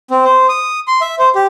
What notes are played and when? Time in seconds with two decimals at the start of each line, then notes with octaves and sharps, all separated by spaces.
0.11 C4
0.25 C5
0.49 D#6
0.87 C6
1.01 E5
1.19 C5
1.35 G4